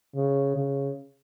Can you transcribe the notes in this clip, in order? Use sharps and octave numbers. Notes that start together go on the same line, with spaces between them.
C#3
C#3